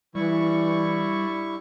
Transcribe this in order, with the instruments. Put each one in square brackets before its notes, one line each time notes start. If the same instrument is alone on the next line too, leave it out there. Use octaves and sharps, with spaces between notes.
[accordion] G2 E4 C#6 [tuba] E3 [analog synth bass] G3